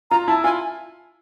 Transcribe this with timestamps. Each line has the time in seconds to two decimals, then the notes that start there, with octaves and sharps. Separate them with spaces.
0.11 F4 A#5
0.28 E4 A5
0.44 F4 G#5